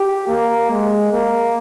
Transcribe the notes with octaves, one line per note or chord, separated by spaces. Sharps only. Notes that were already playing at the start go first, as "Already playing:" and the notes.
Already playing: G4
A#3
G#3
A#3